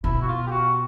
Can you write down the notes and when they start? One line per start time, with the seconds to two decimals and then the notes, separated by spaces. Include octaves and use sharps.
0.04 B2 E4
0.22 F#4
0.28 F4
0.47 G4
0.51 F#4